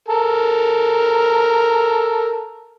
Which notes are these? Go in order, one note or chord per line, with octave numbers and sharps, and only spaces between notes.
A4 A#4